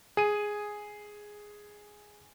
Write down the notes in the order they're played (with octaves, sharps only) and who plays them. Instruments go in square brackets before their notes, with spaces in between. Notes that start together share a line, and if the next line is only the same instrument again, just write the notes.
[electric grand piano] G#4 D#7